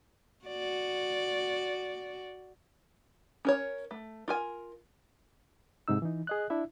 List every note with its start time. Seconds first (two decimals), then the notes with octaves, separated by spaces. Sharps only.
0.46 F#4 D5
3.45 C#4 A#4 C#5
3.91 A3
4.28 F4 A#4 G#5
5.88 G#2 C3 D#4 E6
6.02 E3 D#4
6.27 G#4 D#5 F#6
6.50 D4 E4 E5